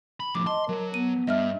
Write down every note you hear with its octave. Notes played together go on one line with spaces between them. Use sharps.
B5
F2 A2 D6
D#5 A5 C6
F#3 A#4
B3 D#7
G2 D#5 E5 F6